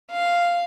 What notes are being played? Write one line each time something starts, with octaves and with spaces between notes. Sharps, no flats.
F5